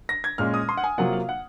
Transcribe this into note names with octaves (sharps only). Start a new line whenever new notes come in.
A#6
G#6
A#2 G#3 C#4 F6
D#6
C6
F#5
G#5
C3 F#3 A#3 F4 F#5
F5
F#5